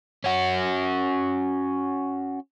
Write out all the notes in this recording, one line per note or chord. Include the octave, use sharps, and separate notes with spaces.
C#4 F#4